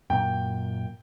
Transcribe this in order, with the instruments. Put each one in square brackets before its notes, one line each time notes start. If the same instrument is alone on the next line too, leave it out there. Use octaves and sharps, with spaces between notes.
[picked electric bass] F#2 A#2 [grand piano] G5